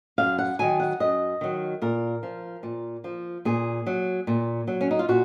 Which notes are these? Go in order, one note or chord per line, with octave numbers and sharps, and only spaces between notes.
F#2 F5
F#5
D#3 F#3 G#5
F#5
F#2 D#5
D#3 F#3
A#2 A#4
F3
A#2
F3
A#2 G#4
F#3
A#2
F#3
C#4
D#4
F4
A#2 F#4